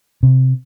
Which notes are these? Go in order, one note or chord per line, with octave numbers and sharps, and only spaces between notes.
C3